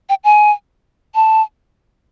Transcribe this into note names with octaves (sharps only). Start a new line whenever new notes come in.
G5
G#5
A5